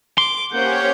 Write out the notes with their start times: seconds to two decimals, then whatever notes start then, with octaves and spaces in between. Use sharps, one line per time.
0.18 C6 D6
0.52 A#3 C#4 G4 C5 C#5 F#5 G6